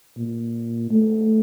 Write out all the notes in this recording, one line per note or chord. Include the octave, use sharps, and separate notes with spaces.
A#2
A3